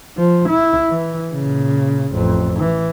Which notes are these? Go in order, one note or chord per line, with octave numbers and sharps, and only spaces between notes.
F3
E4
E3
A#2 C#3
A1 F2
E3